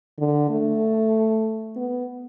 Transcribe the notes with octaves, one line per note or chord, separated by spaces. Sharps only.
D3
A3
B3